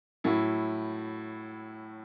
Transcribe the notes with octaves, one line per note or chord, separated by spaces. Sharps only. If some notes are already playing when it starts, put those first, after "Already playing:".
A2 F#3 E4